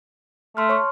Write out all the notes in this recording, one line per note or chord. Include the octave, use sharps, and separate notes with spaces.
A3 C6 F6
C#5 A5 C#6